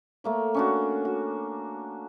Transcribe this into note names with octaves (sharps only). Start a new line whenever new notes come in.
A3 A#3 C#5
C#4 D4 F#4
F#4